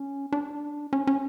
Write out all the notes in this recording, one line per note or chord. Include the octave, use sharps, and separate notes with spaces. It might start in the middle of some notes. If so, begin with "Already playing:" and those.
Already playing: C#4
D4
C#4
C#4